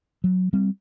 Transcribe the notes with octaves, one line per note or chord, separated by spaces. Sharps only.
F#3
G3 C4